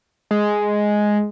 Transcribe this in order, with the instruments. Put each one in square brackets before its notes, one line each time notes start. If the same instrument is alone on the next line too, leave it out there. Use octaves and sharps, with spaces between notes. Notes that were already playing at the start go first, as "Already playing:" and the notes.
[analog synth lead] G#3